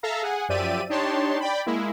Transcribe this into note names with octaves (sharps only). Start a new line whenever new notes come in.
A4 E5 F5 A#5
G#4 F#5 G#5
F#2 F3 G4 D5 E5 D#7
D4 D#4 G4 C#5 A5 C6
D5 G5 B5
G#3 A#3 E4